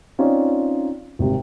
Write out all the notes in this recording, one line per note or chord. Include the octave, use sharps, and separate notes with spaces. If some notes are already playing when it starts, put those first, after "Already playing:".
C4 C#4 D#4 F4 D5
G#1 C3 G3